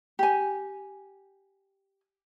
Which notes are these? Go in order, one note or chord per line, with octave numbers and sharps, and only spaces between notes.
G4 G#5